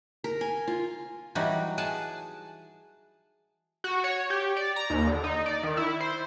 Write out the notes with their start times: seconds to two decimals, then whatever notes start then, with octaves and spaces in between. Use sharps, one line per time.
0.24 A#4
0.41 G#5
0.67 F4
1.35 E3 F#3 G3 D#4 F#4
1.78 G#4 F#5 G#5 A5
3.84 F#4
4.04 C#5
4.30 G4
4.57 D5
4.76 A#5
4.90 D#2
5.07 D3
5.24 D#4
5.46 D5
5.63 D#3
5.77 E4
6.00 C5